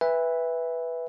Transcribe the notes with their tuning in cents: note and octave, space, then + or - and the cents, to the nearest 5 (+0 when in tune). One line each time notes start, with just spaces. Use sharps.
B4 +0 E5 +0 G#5 -40